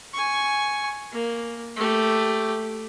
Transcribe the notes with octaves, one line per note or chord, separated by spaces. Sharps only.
G#5 C#6
A#3
A3 G4